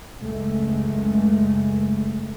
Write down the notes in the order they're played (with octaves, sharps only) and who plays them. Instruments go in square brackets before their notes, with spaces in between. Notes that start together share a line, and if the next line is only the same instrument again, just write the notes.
[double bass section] C#2 F#2 G#3 A3